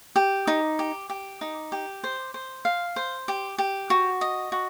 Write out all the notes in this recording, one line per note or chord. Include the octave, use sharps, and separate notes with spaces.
G4
D#4
G4
G4
D#4
G4
C5
C5
F5
C5
G4
G4
F#4
D#5
F#4